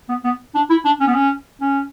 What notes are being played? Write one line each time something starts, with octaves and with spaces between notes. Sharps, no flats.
B3
B3
D4
E4
D4
C#4
B3
C#4
C#4